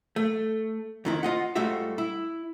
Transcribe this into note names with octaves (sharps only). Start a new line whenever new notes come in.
A3
F2 D#3 E4
F4 D#5 F#5
G#2 G3 A3 F4 F#4 E5
E4